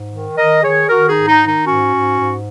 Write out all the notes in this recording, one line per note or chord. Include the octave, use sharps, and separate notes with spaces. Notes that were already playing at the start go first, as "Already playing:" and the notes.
Already playing: G#2
D#3
D#3 A#4 D#5
D#3 G#4 C#5
D#3 F#4 A#4
D#4 G#4
G#2
D#4
D#3
D#4
G#2 C#4 F#4
G#2
G#2